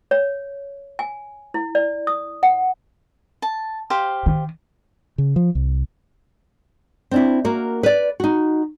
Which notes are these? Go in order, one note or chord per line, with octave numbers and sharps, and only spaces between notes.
C#5
G#5
E4
D5
D#6
F#5
A5
G4 C5 F5
D#3
C#3
F3
C2
C4 D4 E4
A#3 F#4 A#4
B4 D5
D#4 F#4